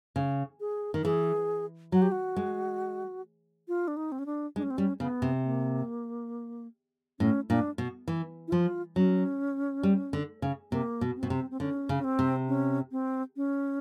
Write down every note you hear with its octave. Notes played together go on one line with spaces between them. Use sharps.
C#3
G#4
D#3
E3 G#4
F#3 F#4
G4
F#4
G#3
F4
D4
D#4
C4
C#4
D4
G#3 D4
C#4
C4
G3 C#4
C#3 B3
C3
A#3
A2 C#4
A#2 D4
B2
E3
E4
F3 F4
F#3 C#4
G3
D3
C#3
C3 A#3
B2
C4
B2
C3
C4
D3 C#4
C#3
C#4
C4
C3
C#4
C4
C#4